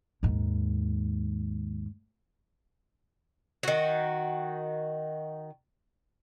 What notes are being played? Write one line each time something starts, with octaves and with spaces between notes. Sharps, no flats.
D#2 G#2
D#3 F#4